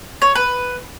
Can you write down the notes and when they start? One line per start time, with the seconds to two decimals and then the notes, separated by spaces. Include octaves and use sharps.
0.22 C#5
0.35 B4